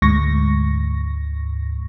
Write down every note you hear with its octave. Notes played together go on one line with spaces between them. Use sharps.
D2 G#2 C#6 A#6